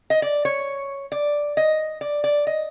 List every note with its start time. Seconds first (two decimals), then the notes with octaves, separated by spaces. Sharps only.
0.10 D#5
0.22 D5
0.45 C#5
1.12 D5
1.57 D#5
2.01 D5
2.24 D5
2.47 D#5